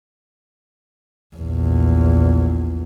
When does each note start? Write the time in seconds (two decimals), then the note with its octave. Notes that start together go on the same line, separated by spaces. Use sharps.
1.36 A#1 E2